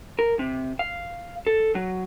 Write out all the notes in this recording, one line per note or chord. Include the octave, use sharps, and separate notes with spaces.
A#4
C3
F5
A4
F#3